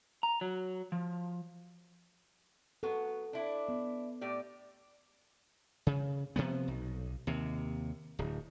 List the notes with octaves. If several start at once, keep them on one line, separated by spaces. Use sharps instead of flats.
A#5
F#3
F3
F#3 B3 A4
D4 E4
B3
A2 G4 D5
C#3
C3 F3 B3
B1
D#2 C3
D1